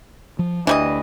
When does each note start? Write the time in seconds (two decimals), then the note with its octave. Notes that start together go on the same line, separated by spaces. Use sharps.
0.39 F3
0.67 D2 E3 G3 D4 D#5